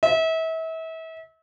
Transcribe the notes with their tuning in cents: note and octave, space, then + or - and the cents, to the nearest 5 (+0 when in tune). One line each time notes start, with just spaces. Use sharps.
E5 -35